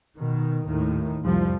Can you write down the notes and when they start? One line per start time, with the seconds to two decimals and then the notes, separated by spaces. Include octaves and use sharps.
0.18 B2 D#3
0.65 D#2 A2 D#3
1.23 C2 F2 F3 G3